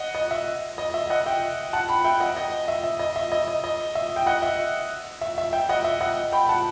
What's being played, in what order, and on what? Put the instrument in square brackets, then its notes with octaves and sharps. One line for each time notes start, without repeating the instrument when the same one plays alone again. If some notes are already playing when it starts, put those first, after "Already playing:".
Already playing: [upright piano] D#5 F#5
D#5
E5
D#5
E5
D#5 F#5
E5 G5
F#5 A5
G5 B5
E5 G5
D#5 F#5
D#5
E5
E5
D#5
E5
D#5
D#5
D#5
E5
G5
D#5 F#5
E5
E5
E5
E5 G5
D#5 F#5
E5
D#5 F#5
G5 B5
F#5 A5